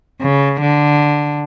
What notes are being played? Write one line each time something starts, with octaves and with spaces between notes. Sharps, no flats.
C#3
D3